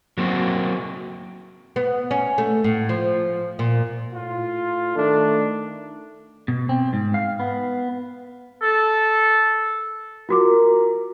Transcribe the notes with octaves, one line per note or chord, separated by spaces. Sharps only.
F#3 A#3 C4 F#4
B3
C#4
A3
A2
F3
A#2
A2 F4
D#3 A3 D4
B2
C4
G#2
F5
B3
A4
F4 F#4 A#4 D6